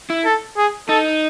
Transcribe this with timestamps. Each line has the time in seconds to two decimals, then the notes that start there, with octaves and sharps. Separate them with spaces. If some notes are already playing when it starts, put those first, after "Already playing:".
0.10 E4
0.26 A4
0.57 G#4
0.89 D#4 A4